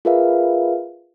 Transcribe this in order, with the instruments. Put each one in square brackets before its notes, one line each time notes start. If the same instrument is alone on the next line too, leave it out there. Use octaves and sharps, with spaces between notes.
[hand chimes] F4 G#4 A#4 B4 E5 F5